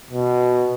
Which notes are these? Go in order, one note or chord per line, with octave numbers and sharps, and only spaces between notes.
B2